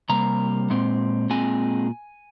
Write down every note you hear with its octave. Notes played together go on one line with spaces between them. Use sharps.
C3 G3 A#3 A#5
A#2 G#3 C4
A#2 G#3 C4 G#5